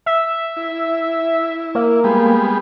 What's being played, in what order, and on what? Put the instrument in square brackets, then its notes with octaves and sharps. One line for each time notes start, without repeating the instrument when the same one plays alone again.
[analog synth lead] E5
[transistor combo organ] E4
[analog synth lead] A#3
[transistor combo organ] G3 G#3 B3